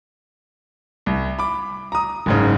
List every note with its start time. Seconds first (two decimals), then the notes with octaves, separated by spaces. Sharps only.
1.06 C2
1.39 B5 D6
1.92 A#5 D#6
2.26 F#1 G#2 C#3